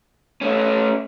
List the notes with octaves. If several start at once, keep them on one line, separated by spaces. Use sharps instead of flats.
A3 C#4